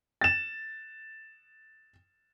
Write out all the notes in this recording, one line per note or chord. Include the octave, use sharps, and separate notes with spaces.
A6 E7